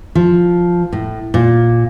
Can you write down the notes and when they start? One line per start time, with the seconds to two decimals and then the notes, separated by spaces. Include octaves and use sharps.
0.15 F3
0.92 A2
1.34 A#2